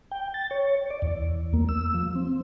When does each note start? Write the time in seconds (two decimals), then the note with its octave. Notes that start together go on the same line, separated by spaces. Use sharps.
0.11 G5
0.34 A6
0.51 C#5
0.90 D5
1.02 E2
1.53 A#3
1.69 E6
1.94 F3
2.16 C4